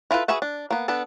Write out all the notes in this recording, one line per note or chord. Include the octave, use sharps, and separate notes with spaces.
E4 F4 A4 B4
F#4 G#4 B4 E5 F#5
D4
A#3 B3
B3 D4 A4